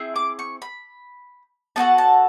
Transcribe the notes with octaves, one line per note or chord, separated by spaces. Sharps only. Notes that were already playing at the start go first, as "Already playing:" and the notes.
Already playing: C4 E4 G#4
D6
C#6
B5
B3 D4 F#4 A4 A5
A5